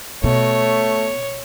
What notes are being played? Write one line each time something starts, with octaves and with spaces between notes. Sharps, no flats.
B2 A3 C#5